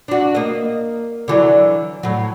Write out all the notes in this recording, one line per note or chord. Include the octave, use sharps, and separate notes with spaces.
D4 F#4
A#3 D#5
D3 E3 F#3
A2 F#3